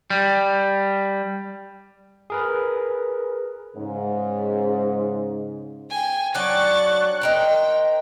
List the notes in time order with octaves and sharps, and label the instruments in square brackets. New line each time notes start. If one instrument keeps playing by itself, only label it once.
[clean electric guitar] G3
[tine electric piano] G#4 A#4 B4
[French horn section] G#2 C#3
[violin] G5 G#5
[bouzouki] F#3 D4 G5 [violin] C#6 A6 [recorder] F#6
[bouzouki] D#4 A#4 C5 [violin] G5